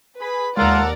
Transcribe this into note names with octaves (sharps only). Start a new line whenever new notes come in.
G#4 B4 B5
D#2 G#3 F4 A4 A#4 D5 F#5